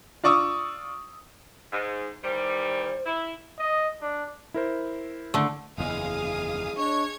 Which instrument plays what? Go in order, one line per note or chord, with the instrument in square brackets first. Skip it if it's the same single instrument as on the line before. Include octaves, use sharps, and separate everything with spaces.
[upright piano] F4 D5 C#6 D#6 E6
[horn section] G#2
[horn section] D#3 E3 G3 [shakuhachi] C5
[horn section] E4
[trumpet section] D#5
D4
[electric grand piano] E4 A#4 C5
[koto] D3 A3
[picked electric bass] F#1 E2 [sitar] G#3 [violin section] F5 G#5 D#6
[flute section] D4 D#5 C#6 [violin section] C#5 G#6